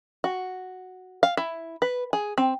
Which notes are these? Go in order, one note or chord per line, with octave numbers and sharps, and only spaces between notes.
F#4
F5
E4
B4
G#4
C4